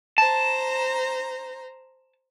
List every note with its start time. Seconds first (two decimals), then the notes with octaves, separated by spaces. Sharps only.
0.18 C5 A5 A#5